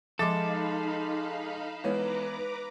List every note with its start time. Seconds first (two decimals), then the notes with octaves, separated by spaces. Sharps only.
0.19 F3 G#3 D#4 A4 F5 B5 D6 A6
1.84 E3 G#3 B3 B4 C#5 A#5 D6